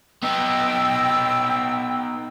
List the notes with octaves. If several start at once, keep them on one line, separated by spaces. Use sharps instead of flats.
B3 D#4 G5 E6